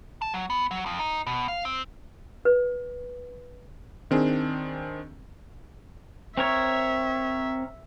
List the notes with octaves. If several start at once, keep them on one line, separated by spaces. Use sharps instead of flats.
A5
F#3
B3
F#3
F2
D#4
B2
F5
C4
B4
D#3 C4 D4 G#4
C4 A#4 C#5 E5